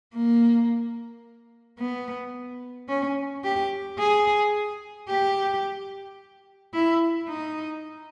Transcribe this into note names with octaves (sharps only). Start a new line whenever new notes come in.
A#3
B3
C#4
G4
G#4
G4
E4
D#4